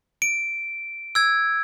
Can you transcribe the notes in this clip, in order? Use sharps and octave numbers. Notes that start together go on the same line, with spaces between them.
D7
E6 G#6